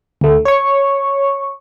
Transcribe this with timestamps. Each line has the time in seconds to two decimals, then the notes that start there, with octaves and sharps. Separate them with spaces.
0.21 D2 A3
0.45 C#5 C#6